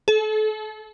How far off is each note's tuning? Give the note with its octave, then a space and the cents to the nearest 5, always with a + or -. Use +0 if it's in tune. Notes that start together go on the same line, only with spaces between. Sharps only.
A4 -35